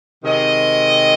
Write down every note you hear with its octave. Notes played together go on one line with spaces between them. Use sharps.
C3 D#3 G#3 C4 D#5